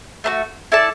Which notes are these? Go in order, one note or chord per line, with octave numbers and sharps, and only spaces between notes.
A3 D4 F#4
E4 A4 D5 A5